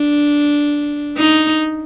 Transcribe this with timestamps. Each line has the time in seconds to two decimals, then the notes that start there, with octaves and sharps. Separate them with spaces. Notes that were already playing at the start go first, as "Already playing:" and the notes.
Already playing: D4
1.17 D#4